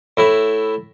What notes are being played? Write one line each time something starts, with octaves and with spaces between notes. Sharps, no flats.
A2 E4